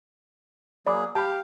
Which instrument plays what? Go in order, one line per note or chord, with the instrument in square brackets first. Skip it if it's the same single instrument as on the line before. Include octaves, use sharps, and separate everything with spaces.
[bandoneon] F#3 A#3 G#4 [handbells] D5 B5 D6
[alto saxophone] G4 [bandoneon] F5 [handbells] A5 B5